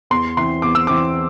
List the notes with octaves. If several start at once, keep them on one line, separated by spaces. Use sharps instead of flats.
E2 C6
E3 C4 C6
E2 D6
E6
E3 C4 D6